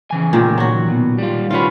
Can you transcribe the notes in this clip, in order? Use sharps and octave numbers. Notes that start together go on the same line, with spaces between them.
C#3 E3 G#5
A#2 D#3 A#3
F#3 F#4
B2
G3 F4
D#3 C#4 F4 F#4 B4